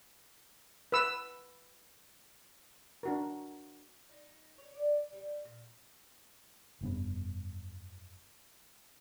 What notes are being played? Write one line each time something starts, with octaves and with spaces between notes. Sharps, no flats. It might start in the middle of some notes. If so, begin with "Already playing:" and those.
B4 E6
D4 F#4 A#4
D#4
C#5
D5
G3
A#2
F1 G2 B3